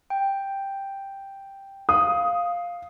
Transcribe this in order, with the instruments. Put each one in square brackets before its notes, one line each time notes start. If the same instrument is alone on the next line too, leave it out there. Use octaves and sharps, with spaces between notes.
[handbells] G5
[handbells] F5 [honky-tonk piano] D#6